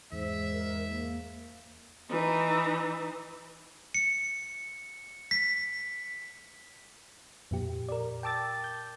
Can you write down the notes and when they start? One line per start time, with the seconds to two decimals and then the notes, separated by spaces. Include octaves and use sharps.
0.12 E2 G#2 C5 E5
0.52 A#4
0.89 A#3
2.10 E3 D#4
3.94 C#7
5.31 B6
7.51 F2 A#2 G4
7.89 A#4 D5
8.23 G5 A5 D6 E6 A6
8.64 G6